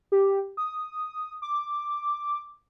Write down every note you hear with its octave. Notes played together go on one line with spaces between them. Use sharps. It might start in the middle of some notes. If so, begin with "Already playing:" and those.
G4
D#6
D6